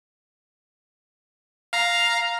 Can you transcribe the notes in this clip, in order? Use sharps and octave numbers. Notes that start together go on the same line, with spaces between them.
F5 A#5